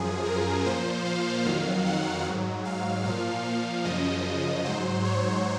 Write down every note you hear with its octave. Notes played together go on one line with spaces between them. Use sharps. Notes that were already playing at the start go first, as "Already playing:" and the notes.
Already playing: F#2 F3 G#4
A#4
A#2 F3 C5
F5
F2 D#3 F#3 F5
F#5
G#2 F#3
F5
A#2 F3 F5
F5
F#2 C#3 F3 D#5
G#2 F#3 C5
C#5